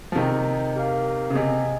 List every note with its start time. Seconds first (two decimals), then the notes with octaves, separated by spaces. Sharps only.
0.12 F3
0.16 C3 D#3 G#4 D#5 G5
0.76 G4 A#4 F5
1.30 C#3
1.35 C3 G#4 D#5 G#5